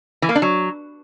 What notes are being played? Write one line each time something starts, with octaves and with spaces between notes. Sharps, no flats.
E3
A#3
D4
F#3